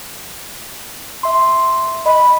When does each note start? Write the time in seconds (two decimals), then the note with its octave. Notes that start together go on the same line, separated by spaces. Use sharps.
1.23 E5 C6
2.06 D#5 B5